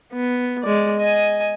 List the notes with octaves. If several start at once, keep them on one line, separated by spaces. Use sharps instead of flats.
B3
G#3 D5
D#5 G#5